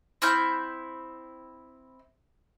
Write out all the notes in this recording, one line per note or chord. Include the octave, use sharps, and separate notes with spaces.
C4 E4 F6 G6